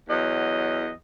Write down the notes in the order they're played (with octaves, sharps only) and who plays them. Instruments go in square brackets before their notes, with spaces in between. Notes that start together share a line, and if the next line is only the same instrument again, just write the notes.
[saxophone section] E2 F#3 D#5